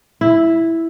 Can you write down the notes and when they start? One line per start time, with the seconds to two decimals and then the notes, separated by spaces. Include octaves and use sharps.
0.21 E4